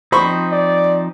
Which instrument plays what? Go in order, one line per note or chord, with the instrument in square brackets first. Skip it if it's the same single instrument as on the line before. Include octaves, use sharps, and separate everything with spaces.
[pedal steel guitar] F3 C4 D#4 [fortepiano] C5 B5 C#6
[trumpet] D5